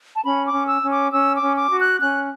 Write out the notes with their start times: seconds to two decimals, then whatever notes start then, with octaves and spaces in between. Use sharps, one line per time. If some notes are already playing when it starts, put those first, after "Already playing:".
0.16 A5
0.23 C#4 B5
0.45 D6
0.53 C#4
0.67 E6
0.82 C#4
0.90 D6
1.11 C#4 E6
1.34 D6
1.41 C#4
1.56 D6
1.70 F#4
1.78 F#6
2.00 C#4 F#6